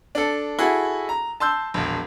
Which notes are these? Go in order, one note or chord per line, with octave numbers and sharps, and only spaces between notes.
D4 A4
E4 F#4 G#4 A4
A#5
A5 C6 E6 G6
E1 A#1